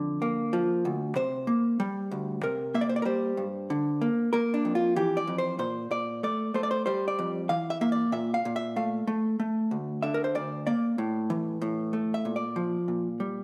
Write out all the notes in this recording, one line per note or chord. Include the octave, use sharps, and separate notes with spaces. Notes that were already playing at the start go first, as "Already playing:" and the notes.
Already playing: F2 D3
A#3
F3
D2
C3 C5
A#3
G3
D2
C3 A#4
A#3 E5
D5
C5
D5
A#4
G3 C5
G2
D3
A#3
A#3 A#4
D4
F2
F4
E3 G4
D5
F2
C5
A#2 C5
A#2 D5
A3 D5
A3 C5
D5
C5
G3 C5
D5
F2
E3 F5
E5
A#3 E5
D5
A#2 E5
F5
A#2
E5
A3 F5
A3
A3
D2
D3 E5
A#4
C5
D2 D5
A#3 D5
A2
E3
A2
A3
E5
A#2
D5
F3
A#2
G3